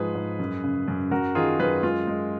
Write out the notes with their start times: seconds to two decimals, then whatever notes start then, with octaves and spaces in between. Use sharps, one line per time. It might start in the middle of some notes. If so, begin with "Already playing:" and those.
Already playing: G#2 F3 G#4 B4
0.15 G#2
0.39 F#2
0.63 C#3
0.88 F#2
1.11 F#2 F#4 A#4
1.35 D#3 F4 G#4
1.59 F#2 G#4 B4
1.83 G#3 F4
2.07 G#3